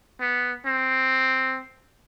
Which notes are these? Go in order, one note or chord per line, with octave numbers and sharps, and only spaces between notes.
B3
C4